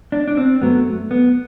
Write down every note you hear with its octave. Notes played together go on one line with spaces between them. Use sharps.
D4
D4
C4
F#2 F#3 A3 B3
B3